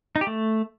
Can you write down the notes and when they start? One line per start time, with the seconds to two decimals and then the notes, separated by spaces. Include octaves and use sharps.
0.16 D#4
0.21 G4
0.27 A3